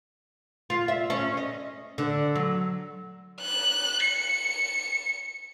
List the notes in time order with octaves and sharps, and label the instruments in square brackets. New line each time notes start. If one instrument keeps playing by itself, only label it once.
[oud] F4
E5
C#4
D#5
D3
F#3
[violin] F#6
C#7